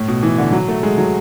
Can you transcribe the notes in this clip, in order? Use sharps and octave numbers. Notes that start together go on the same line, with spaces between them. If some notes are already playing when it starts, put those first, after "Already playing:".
Already playing: A2
B2
E3
D3
F#3
A3
G#3
F#3